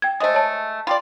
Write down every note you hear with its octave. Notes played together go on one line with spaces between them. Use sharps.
G5 G#6
G#3 A3 C5 D#5 D#6
C#5 A5
F4 G4 D5 B5